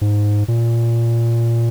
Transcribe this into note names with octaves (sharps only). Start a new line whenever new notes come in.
G#2
A#2